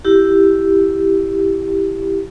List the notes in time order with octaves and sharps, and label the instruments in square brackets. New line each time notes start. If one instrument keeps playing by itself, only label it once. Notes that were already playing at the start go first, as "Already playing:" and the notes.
[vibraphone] E4 G4